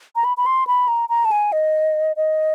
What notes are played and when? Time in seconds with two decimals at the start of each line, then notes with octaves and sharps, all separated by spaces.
0.16 A#5
0.24 B5
0.37 B5
0.46 C6
0.67 B5
0.88 A#5
1.09 A#5
1.25 A5
1.31 G#5
1.52 D#5
2.16 D#5